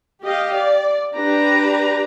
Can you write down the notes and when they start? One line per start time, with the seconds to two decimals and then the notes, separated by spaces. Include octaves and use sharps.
0.23 G4 D#5 F5
0.55 D5
1.15 D4 G4 B4 A#5